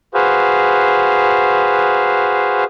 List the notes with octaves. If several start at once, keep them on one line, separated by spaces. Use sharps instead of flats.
F#4 G#4 B4 C5 F5